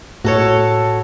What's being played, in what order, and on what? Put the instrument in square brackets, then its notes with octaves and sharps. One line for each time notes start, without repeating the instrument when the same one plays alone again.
[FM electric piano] A2 [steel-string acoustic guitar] F#4 A4 C#5